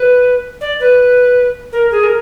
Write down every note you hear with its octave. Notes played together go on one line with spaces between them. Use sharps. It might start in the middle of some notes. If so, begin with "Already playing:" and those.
Already playing: B4
D5
B4
A#4
G#4
A#4